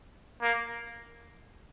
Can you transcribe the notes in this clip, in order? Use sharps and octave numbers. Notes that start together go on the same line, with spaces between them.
A#3